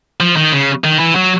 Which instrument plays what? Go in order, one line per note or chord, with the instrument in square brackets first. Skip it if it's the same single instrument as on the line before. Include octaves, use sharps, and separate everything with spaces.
[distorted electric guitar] F3
D#3
C#3
D#3
E3
F#3